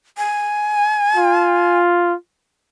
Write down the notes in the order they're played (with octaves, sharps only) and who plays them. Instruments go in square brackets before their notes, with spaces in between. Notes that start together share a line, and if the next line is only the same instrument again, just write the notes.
[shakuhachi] G#5
[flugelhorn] F4